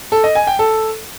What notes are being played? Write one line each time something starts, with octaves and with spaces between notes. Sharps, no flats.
A4
D#5
G#5
G5
A4